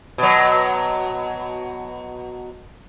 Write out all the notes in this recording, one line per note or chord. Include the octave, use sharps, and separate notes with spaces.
B2 F#3